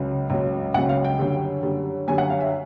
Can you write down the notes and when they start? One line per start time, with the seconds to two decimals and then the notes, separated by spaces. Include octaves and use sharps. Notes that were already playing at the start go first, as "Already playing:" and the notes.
Already playing: C#2 C#3 F#3
0.30 C#2 C#3 F#3
0.74 C#2 C#3 F#3 F#5
0.89 F5
1.05 G5
1.19 F#2 D3 G3
1.63 F#2 D3 G3
2.08 F#2 D3 G3 G#5
2.18 F#5
2.30 F5
2.41 E5